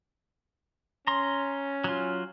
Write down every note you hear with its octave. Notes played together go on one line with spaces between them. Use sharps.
C#4 A#5 C6
F#3 F4